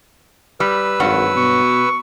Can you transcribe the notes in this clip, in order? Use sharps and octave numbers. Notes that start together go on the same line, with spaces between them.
G3 B4 E6
G#1 G2 F#3 F#5
B2 C#6